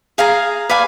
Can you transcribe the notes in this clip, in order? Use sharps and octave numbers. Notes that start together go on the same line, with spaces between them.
G#4 F5 G#5 A#5
B4 D5 F5 G#5